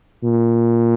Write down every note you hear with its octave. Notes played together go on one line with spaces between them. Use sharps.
A#2